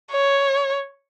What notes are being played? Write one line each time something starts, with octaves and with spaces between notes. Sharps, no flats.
C#5